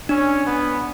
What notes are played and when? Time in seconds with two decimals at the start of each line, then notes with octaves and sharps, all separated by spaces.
0.09 C#4 D4
0.47 B3